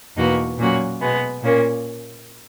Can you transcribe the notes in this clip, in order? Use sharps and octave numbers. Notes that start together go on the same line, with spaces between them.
E2 B2 A#3 D#4 F#4
A#2 F#3 A#3 C#4 F#4
B2 G#3 B3
A#2 A#3 C#4